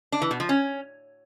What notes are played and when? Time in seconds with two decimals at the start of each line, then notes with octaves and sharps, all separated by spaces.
0.12 D4
0.22 E3
0.31 B2
0.40 F3
0.49 C#4